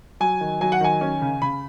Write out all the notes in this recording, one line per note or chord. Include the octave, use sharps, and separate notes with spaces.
F#3 G#5
D#3
F#3 G#5
F#5
D#3 G#5
C#4
C#3
C#3 B5